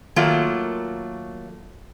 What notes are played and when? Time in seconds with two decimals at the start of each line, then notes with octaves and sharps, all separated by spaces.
0.16 D#3 F#3 A3 A#3 F4